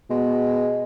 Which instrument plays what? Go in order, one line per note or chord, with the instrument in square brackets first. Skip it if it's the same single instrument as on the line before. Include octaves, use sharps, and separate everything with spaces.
[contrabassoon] B2 [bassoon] G#3